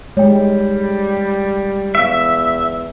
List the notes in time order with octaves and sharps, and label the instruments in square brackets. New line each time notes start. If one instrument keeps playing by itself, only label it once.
[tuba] G3 [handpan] G#3 [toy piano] C#5 G5
[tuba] E2 [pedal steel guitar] E5 [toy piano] F5 C#6